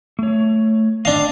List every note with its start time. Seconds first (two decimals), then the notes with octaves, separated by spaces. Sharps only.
0.19 A3 C#5
1.05 C4 D4 D#5 F5